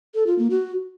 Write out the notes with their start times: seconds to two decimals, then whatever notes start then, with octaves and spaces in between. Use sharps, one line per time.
0.15 A4
0.27 F4
0.39 A#3
0.50 F#4